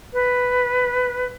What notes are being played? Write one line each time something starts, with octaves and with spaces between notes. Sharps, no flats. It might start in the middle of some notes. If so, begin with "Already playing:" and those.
B4